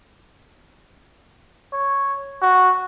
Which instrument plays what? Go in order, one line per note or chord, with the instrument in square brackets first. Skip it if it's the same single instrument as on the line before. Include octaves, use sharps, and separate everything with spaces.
[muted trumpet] C#5
F#4